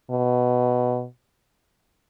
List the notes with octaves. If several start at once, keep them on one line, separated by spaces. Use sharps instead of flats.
B2